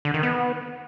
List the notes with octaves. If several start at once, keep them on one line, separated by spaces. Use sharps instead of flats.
D3
D#3
B3